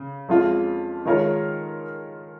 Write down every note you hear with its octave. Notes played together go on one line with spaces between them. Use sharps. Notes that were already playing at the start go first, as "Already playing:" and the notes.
Already playing: C#3
F2 F3 G#3 C#4 F4
D#3 G#3 F4 A#4 C#5